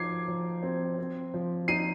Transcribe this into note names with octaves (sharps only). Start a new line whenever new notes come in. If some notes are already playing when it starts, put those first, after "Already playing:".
Already playing: F3 D#4 D6 G#6 C7
F3
C4
C4
F3
D#4 C7 D#7